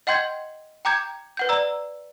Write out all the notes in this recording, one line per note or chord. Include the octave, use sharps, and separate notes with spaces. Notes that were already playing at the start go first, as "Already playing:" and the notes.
D#5 F#5 G5 C6 G6 G#6
G5 A#5 D6 G6 G#6
B4 F#5 G6
D5 A#5 E6